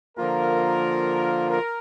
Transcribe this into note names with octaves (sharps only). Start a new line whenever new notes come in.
D3 F3 A#3 F4 A#4
A#4